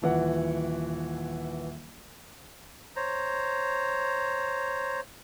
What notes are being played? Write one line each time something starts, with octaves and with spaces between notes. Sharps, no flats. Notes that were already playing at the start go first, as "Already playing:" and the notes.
D#1 E3 F#5
C5 C#5 A#5